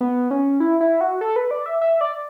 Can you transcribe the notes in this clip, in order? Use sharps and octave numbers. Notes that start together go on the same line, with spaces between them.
B3
C#4
E4
E4
F#4
A4
B4
D5
E5
E5
D5